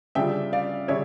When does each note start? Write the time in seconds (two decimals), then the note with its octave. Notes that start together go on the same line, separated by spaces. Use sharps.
0.15 C#3 G3 D4 F4 E5 G5
0.53 D5 F5
0.88 C#3 G3 C#5 E5